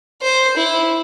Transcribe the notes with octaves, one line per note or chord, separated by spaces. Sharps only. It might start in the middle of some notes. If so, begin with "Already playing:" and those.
C5
E4